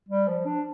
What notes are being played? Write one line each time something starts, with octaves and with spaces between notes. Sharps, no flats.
G3
F3
D4